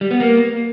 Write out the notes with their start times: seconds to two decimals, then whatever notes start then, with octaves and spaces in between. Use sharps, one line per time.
0.01 G3
0.11 B3
0.20 A#3